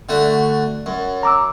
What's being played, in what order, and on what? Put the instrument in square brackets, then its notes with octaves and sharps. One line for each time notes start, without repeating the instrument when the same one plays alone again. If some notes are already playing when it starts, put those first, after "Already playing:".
[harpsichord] D3 A3 F#4
F#2
[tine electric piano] A#5 D6 E6